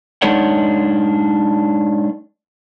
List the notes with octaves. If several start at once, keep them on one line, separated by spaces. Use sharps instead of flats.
G#3 D4 D#4 A#4 C#5 F#5